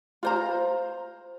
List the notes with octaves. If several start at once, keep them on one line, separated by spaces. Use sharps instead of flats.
F4 C5 A#5